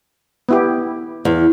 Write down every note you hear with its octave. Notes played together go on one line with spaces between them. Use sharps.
B3 E4 G4
E2